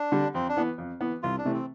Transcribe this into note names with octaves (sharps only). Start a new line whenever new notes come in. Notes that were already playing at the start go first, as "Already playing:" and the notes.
Already playing: D4
D3 G3
F2 C4
D4
E3 B3
F2
E3 B3
C2 F4
D4
C3 E3 A3
C4